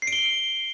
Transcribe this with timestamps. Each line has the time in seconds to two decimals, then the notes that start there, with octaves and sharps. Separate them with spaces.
0.02 C7
0.07 D7
0.13 G7